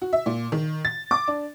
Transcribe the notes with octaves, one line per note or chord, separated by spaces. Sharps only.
F#4
E5
A#2
D#3
A6
D6
D4